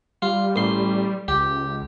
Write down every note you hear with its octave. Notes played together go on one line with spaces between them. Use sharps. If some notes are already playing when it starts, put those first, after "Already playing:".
G3 F4
A1 C6
C#2 G4